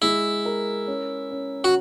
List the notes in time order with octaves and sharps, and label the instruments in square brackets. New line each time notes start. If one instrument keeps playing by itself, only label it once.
[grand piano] G#3 [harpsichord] E4
[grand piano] A#4
C#4
C#4
[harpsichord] F#4